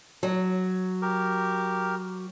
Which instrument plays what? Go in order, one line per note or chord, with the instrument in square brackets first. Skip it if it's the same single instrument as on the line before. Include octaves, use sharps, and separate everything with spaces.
[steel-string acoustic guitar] F#3
[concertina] G4 A#4